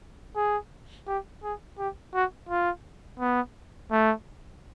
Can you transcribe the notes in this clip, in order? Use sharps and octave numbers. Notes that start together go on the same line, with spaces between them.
G#4
G4
G#4
G4
F#4
F4
B3
A3